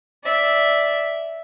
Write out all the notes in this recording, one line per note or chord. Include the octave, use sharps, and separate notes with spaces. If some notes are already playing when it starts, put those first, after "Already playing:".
D5 E5